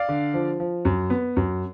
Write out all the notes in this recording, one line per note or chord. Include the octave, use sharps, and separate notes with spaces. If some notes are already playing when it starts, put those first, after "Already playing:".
Already playing: D5 F5
D3
F3
F3
F#2
B3
F#2